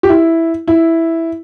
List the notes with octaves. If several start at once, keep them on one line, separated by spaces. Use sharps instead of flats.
G4
E4
E4